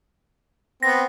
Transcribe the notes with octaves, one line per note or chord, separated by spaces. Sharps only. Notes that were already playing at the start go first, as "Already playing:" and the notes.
B3 C4 A#6